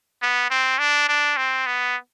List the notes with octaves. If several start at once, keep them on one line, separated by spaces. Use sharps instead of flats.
B3
C4
D4
D4
C4
B3